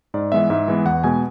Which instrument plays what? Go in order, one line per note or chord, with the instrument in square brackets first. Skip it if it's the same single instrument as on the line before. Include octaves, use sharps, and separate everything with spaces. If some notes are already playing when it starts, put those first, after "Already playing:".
[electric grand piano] G#2 D5
E3 G#3 B3 E5
G#2 E5
E3 G#3 B3
E2 F#5
B2 G#3 B3 G#5